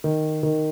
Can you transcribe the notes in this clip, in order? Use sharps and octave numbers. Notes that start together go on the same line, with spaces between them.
D#3
D#3